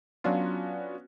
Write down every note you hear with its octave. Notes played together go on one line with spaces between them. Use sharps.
F#3 B3 C#4 D4 F4 F#4